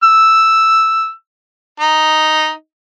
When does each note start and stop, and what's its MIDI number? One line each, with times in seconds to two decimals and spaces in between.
0.03 1.09 88
1.80 2.51 63